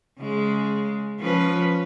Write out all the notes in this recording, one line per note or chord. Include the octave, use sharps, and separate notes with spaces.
C#3 G#3
F3 C#4 B4